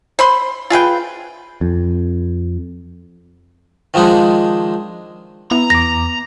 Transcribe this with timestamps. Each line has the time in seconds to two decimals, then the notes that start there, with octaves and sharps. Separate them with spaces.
0.19 C5 B5 C6
0.70 F4 G#4 B4 G5
1.61 F2
3.94 D#3 F3 G#3 D4 D#4
5.51 B3 E4 A#5
5.70 E2 D6 A#6